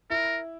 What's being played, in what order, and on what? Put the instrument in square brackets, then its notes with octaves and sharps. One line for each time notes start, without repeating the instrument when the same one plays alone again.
[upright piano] E4 [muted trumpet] A#4